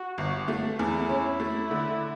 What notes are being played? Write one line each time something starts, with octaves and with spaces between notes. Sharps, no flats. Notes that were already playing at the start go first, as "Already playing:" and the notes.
Already playing: F#4
G1
A3
E2 E4
C#4
A3
D3